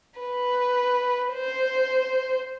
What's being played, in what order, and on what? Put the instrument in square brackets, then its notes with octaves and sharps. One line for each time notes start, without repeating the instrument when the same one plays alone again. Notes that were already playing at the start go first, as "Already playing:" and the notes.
[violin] B4
C5